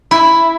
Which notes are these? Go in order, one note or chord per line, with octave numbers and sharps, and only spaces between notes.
E4